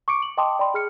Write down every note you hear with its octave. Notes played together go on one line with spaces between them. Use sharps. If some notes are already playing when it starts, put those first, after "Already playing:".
C#6 D6 C#7 D7
F#7
D#5 G5 A5 C6 D6 D#6
D5 G5 B5 C6
G#4 F6 C#7